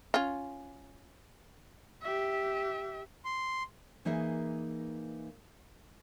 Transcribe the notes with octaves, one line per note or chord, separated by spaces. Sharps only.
C#4 F4
G4 E5
C6
E3 A#3 D#4 G#4 A#4 E5